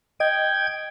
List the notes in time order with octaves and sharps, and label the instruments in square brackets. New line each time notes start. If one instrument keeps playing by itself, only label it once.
[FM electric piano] D#5 [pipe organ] G5 G#6